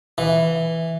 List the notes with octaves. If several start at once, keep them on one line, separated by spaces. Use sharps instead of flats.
E3